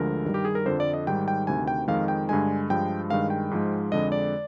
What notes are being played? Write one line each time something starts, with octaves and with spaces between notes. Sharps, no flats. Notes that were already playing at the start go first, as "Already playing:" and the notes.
Already playing: D2 D3 F3 G#3 A#4
G2 D#3 G3
G4
G#4
A#4
F2 D3 F3 C5
D5
D#5
G#2 D#3 G3 G5
G5
D2 C3 D#3 G#5
G5
F2 D#3 G#3 F5
G5
G2 D3 G#3 G#5
G2 F3 G#3 G5
G2 D#3 G#3 F5
G5
G#2 F3 G#3
F2 D3 G#3 D#5
D5